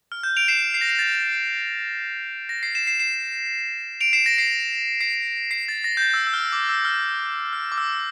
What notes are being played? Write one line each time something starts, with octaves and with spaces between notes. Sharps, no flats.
F6
G6
D7 F7
C7 E7
C7
A#6
C7
A6
A#6
C7
C7 E7
C7 E7
C7 E7
D7 F7
C7 E7
A#6 D7
C7
C7
C7
A6
A#6
G6
A6
E6
E6
F6
E6
D6
E6
F6
F6
D6
E6